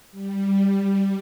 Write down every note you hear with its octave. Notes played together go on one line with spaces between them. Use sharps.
G3